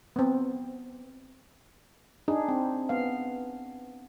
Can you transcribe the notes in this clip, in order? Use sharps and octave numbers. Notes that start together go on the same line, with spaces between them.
B3 C4
D4 D#4 G#4
C4
B3 F5